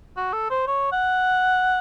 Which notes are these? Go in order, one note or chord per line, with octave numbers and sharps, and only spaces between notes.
F#4
A4
C5
C#5
F#5